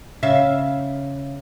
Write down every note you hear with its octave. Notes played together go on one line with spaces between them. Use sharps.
C#3 E5 F5